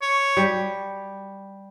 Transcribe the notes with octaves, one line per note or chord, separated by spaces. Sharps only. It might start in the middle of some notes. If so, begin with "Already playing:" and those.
C#5
G3